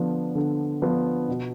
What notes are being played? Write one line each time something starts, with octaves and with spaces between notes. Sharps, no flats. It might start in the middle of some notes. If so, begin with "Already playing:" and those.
Already playing: D3 F3 B3 D4 F4
D3
F3 B3 D4 F4
B2